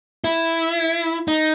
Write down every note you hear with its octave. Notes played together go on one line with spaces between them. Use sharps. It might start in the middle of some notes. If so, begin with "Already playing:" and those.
E4
D#4